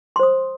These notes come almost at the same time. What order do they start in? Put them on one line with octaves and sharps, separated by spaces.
C6 C5 D#6